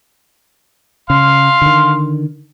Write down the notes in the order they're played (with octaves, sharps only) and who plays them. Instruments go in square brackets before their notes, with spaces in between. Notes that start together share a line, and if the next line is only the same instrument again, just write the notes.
[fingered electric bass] C#3 [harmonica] F5 C6
[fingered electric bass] D3 D#3